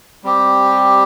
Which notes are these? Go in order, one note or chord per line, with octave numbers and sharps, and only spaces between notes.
G3 C4 G4